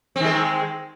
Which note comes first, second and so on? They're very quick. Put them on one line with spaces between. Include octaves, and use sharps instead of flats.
C4 D#3 G#3